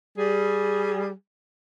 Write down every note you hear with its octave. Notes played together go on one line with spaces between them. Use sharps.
G3 G#4